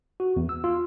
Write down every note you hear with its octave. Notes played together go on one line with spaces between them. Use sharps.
F#4
E2
E6
F4